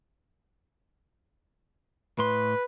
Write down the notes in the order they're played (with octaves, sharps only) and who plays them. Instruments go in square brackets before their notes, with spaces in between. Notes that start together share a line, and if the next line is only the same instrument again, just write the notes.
[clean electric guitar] A2 C6 [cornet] B4